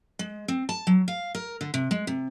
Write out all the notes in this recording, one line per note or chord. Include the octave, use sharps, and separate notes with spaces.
G#3
C4
A5
F#3
F5
A#4
D3
C3
G#3
C3